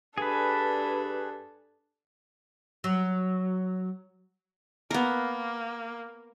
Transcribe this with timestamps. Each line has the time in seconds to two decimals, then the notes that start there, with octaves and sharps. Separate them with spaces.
0.18 G2 D4 G#4 A4 B4
2.84 F#3
4.91 A#3 B3 A#4